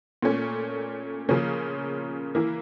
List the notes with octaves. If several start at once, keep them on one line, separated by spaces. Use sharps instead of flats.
A#2 A3 C#4
C#3 F3 A#3 C#4
E3 A#3 E4